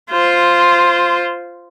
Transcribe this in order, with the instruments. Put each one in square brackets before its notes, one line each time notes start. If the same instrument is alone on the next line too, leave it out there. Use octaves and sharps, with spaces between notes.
[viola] F4 C5